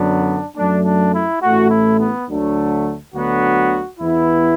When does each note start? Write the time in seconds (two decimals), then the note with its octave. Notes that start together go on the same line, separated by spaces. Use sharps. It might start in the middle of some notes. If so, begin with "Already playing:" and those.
Already playing: F#2 D3 F#3 B3 D4
0.56 F#2 F#3 A3 D4
0.84 D4
1.13 E4
1.41 A1 A2 A3 F#4
1.70 E4
1.99 B3
2.28 D2 D3 F#3 A3
3.12 D2 D3 F#3 B3 F#4
3.98 E2 E3 B3 E4